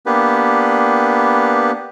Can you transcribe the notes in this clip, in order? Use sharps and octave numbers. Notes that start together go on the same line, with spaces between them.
A#3 B3 D4 G4 B4